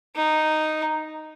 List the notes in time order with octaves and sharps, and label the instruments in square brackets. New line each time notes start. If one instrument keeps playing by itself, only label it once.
[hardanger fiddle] D#4